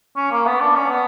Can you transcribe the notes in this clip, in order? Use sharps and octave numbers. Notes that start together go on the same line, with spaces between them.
C#4
A#3
B3
D4
C#4
B3